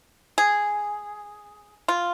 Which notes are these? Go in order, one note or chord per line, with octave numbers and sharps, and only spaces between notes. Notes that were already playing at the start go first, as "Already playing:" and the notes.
G#4
F4